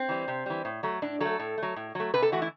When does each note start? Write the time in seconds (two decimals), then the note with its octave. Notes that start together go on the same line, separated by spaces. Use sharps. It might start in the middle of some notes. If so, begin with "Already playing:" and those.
Already playing: C4
0.09 E3 G3
0.28 C3
0.46 E3 G3
0.65 A2
0.83 F#3 A3
1.02 A2 D4
1.20 F#3 A3 A4
1.39 A2
1.58 F#3 A3
1.76 A2
1.95 F#3 A3
2.14 C3 B4
2.22 A4
2.32 E3 A3 F#4
2.42 E4